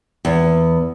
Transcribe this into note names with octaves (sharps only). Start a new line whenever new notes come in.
E2